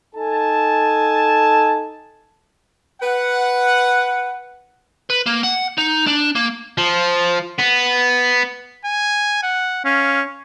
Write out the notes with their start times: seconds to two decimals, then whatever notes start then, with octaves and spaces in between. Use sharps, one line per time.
0.15 D#4 A4 G#5 A5
3.02 B4 F#5
5.10 B4
5.26 A#3
5.43 F#5
5.78 D#4
6.07 D4
6.35 A#3
6.78 F3
7.59 B3
8.85 G#5
9.43 F#5
9.85 C#4 F5